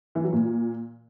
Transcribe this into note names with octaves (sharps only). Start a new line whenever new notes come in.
E3
F#3
A#2